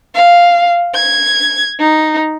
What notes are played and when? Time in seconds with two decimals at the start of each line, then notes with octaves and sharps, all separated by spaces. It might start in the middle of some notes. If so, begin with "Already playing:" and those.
0.15 F5
0.95 G#6
1.80 D#4